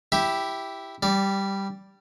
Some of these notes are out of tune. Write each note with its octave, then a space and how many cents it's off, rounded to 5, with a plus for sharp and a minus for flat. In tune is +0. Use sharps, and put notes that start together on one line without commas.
E4 +0 G4 +0 E5 +0
G3 +0 D5 -15